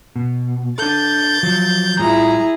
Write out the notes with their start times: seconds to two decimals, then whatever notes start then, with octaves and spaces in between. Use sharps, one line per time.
0.16 B2
0.78 D4 A4 G6 A6
1.43 F3 F#3
2.00 A2 G3 E4 F4 G#4 A#5